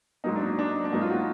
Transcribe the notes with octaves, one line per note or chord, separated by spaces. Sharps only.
G#2 F#3 A#3 D#4
D4
D4
D4
G#2 F#3 A#3 D#4
F4
F#4